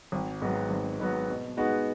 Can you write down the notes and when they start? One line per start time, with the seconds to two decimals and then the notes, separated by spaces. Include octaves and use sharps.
0.12 G#1
0.42 G#2 F#3 B3 F#4
0.70 G#1
1.00 G#2 F#3 B3 F#4
1.29 B2
1.57 G#3 B3 D#4 F#4